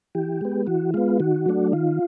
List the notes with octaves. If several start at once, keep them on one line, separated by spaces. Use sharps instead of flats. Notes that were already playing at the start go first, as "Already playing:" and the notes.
E3 G4
G#3 B3
E3 F#4
G#3 B3 F4
D#3 F#4
F#3 A3 D4
D#3 F4